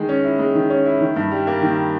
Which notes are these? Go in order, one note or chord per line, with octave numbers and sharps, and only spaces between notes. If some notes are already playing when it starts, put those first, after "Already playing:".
Already playing: D#3 G#3
C#4
E4
G#3
D#3
C#4
E4
D#3
G2
G3
A#3
D#3